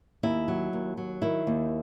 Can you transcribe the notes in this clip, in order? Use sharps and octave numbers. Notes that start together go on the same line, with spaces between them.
D#2 E4
F#3
D#2
F#3
D#3 E4
D#2